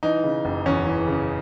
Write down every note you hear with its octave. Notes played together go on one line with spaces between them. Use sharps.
E3 D#4
C#3
F#1
E2 C#4
E3
C#3